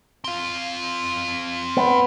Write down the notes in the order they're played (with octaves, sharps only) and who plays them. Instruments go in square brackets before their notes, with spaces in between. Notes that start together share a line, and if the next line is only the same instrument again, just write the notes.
[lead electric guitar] C4 F5
[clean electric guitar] B3